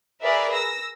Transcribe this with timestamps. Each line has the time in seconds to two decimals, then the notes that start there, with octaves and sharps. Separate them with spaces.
0.22 G#4 A#4 B4 D5 E5
0.54 E6 A#6